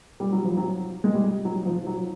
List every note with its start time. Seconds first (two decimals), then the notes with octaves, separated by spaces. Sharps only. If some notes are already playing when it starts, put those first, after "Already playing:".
0.20 G3
0.32 F#3
0.44 F3
0.57 F#3
1.04 G#3
1.14 G3
1.45 F#3
1.66 F3
1.87 F#3